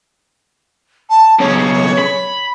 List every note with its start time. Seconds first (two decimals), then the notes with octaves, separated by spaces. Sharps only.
1.10 A5
1.40 B1 C#3 C#5
1.99 B5